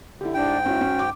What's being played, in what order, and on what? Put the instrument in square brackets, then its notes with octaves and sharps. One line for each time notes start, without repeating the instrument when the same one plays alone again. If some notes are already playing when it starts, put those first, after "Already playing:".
[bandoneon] D3 [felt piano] E4 G4
[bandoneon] G#2 G5 [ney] D4
[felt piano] C#4 E4 [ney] F#4
[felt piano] C#4
D6